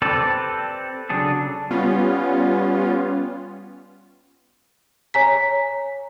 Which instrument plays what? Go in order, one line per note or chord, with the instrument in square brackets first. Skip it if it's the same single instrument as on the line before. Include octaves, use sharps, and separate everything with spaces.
[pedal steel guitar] C4 G4 A4 B4 D5
C#3 F#3 D4 G#4 A4
[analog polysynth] G3 B3 C#4 F4
[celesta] C#5 G#5 A#5 B6